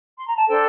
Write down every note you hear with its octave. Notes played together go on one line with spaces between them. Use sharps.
C6
A#5
A5
D4 A4 C5 G5